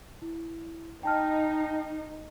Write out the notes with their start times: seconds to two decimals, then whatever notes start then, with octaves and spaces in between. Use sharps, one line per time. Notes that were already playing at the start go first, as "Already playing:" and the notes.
0.22 E4
1.03 D#4 G5 A5 F6